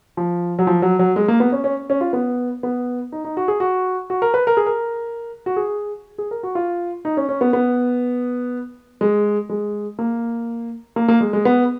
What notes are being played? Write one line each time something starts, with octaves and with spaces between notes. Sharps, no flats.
F3
F#3
F3
F#3
F#3
G#3
A#3
B3
C#4
C#4
C#4
F4
B3
B3
D#4
D#4
F#4
G#4
F#4
F#4
A#4
B4
A#4
G#4
A#4
F#4
G#4
G#4
A#4
F#4
F4
D#4
C#4
C#4
B3
B3
G#3
G#3
A#3
A#3
A#3
G#3
G#3
B3